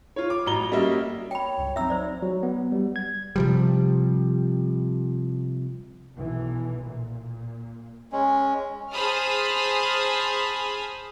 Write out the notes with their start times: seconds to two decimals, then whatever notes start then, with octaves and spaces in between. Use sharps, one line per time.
0.16 F4 C#5
0.30 D6
0.46 A1 F#3 A#5 G7
0.71 F#3 G3 A#3 C#4 D#5 E5
1.31 C#5 G5 B5
1.58 C#2 G2
1.76 F#3 C4 D#4 E5 A#5 E6
1.90 C5 D5
2.22 F#3
2.43 B3
2.72 G3
2.96 G#6
3.36 C3 F3 G3
6.13 B1 E3
6.81 A#2
8.12 G#3 C#4
8.91 G#4 C5 A5 B5 D#6 F6